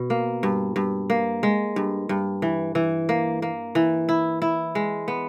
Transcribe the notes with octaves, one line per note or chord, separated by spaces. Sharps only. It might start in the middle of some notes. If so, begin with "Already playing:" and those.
Already playing: B2
A#3
G2
G2
A#3
G#3
G2
G2
E3
E3
A#3
A#3
E3
E4
E4
G#3
B3